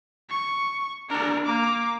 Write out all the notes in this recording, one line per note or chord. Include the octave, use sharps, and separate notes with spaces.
C#6
D4 A#4
A#3 D6